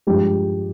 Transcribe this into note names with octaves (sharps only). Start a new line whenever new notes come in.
G2 F3 G#3 G4